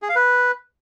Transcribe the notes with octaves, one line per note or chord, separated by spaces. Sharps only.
G#4
F5
B4